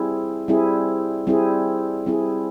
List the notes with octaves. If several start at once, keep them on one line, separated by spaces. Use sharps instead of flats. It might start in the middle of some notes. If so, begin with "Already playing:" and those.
Already playing: G3 C4 E4 G#4
G3 C4 E4 G#4
G3 C4 E4 G#4
G3 C4 E4 G#4